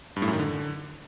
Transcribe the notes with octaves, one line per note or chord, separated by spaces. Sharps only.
G2
A2
F#2
D#3
D3